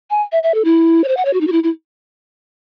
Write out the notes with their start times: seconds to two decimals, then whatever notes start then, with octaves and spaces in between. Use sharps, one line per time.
0.10 G#5
0.32 E5
0.43 E5
0.54 A4
0.64 E4
1.04 C#5
1.08 C5
1.17 F#5
1.25 C#5
1.33 F#4
1.41 D#4
1.47 F#4
1.52 E4
1.63 E4